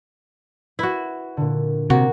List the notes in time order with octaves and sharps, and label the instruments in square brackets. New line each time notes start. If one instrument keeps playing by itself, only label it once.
[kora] E4 F#4 [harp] B4 F#6
[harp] A#2 D3
[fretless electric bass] C3 [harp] A#3 [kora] F#4